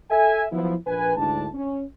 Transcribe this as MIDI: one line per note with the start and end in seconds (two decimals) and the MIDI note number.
0.11 0.45 69
0.11 0.45 76
0.11 0.45 80
0.52 0.75 53
0.52 0.75 54
0.52 0.75 59
0.52 0.75 64
0.87 1.13 34
0.87 1.13 71
0.87 1.13 80
1.17 1.48 38
1.17 1.48 44
1.17 1.48 62
1.17 1.48 64
1.17 1.48 81
1.54 1.82 61